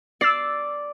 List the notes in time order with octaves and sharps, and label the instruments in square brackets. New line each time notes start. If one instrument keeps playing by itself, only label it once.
[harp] D5 [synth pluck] E6 A6 C7